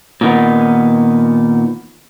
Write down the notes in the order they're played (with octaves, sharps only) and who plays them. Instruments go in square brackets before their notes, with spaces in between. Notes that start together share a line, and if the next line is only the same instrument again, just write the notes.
[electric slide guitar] A#2 D#3 B3